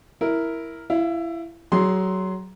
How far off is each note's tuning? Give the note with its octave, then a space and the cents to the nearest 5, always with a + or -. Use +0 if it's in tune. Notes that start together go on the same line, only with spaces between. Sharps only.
E4 +0 A#4 +0
E4 +20 F5 +0
F#3 +20 G#4 +0 C6 +0